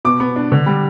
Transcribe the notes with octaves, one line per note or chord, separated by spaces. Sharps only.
B2 D6
B3
D4
D3
G3